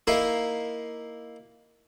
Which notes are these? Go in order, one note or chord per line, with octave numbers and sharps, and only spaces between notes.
A#3 D#4 E4 A#4 E5 F5